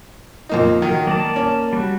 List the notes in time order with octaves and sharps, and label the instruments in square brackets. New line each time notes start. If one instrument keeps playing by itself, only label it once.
[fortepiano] F2 A#3 D#4
[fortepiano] D#3 [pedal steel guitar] F#3
[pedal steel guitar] A#3 D5 A5
[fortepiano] C#4
[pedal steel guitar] G3 F#4